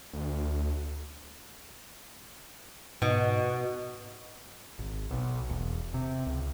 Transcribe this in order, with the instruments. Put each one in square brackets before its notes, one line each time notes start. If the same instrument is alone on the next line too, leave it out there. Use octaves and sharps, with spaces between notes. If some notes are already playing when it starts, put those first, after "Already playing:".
[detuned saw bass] D2
[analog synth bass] G#2 [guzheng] B2
[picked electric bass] G#1
B1
E1
C3
C#2